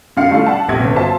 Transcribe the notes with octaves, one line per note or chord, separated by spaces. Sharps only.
F#2 D3 F4 F5 C7 C#7
G3 A3 C#4 D4 E4 F4
F#5 A5
F1 A#1 C3 G4 G#6
G1 C#3
F4 F#4 C5 E5 A5 A#5